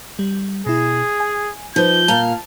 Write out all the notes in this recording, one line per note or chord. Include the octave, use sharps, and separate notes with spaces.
G3
B2 E4 G#4
G#5
F3 D#4 B4 C5 G6
A#2 F5 A5